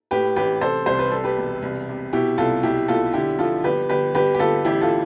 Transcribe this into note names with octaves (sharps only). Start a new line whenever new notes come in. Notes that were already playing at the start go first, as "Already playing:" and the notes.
A2 G4 B4
A1 G4 B4
C3 A4 C5
C2 C5
B4
G3 A4
G4 B4
E1
C2
C3
B2 E4 G4
C2 F4 A4
B1 E4 G4
B1 F4 A4
D3 E4 G4
F3 F4 A4
G1 G4 B4
G1 G4 B4
G1 G4 B4
G4
G1 F4 A4
A1 E4 G4
F4 A4